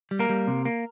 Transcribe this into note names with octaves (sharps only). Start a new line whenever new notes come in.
G3
A#3 A#4
G3
C3
A#3